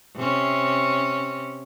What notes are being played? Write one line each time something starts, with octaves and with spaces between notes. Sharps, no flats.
C3 C#4